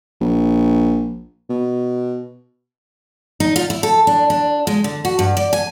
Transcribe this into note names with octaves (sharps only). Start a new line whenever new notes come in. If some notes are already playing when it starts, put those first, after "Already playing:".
A#1
B2
D#4
F4
E4
A4
D4
D4
G#3
D3
F#4
G2
D5
G#5